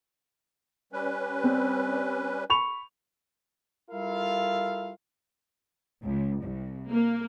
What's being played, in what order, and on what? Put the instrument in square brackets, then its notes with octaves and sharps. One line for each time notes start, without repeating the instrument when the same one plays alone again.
[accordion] G3 C#4 B4
[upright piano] C4
B5 C#6 F7
[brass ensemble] G3 E4 F4 A4 A#4 F5
[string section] C#2
C2
A#3